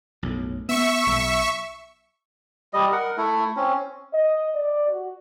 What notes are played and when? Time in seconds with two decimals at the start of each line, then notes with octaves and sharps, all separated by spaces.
0.23 B1 F#2 A2
0.69 B3 E5 C#6
1.06 D#1 B1
2.73 G3 D#5
2.92 A#4 F#5
3.17 A3 E4
3.56 C4 C#4
4.13 D#5
4.54 D5
4.88 F#4